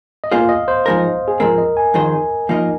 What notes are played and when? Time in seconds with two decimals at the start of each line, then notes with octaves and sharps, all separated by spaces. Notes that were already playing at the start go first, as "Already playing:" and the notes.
0.24 D#5
0.31 A#2 A#3 F4 G#4 C5 F5
0.49 D#5
0.68 C5
0.86 F2 F3 G#3 D#4 A#4
1.28 G#4
1.40 G#2 F3 G#3 C4 A#4
1.58 D#5
1.77 G#5
1.94 F2 D#3 C4 G#4 C5
2.49 F3 A#3 D#4 A#4 D#5